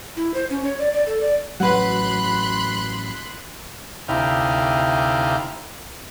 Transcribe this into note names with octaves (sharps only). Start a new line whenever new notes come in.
E4
C5
C#4
C#5
D5
D5
A4
D5
A1 F#3 B4 F#5 B5 C6 F#6
D2 C3 D#4 E4 F5 G5